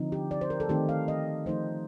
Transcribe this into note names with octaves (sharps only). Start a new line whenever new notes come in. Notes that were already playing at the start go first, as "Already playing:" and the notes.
Already playing: D3 F3 C4 D#4
G4
D5
C5
A#4
A4
D#3 A3 C4 D#4 G4
F5
D#5
F3 A3 D#4 C5